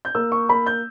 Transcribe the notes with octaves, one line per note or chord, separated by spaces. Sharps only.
G6
A#3 E6
C#6
A#3 B5
G6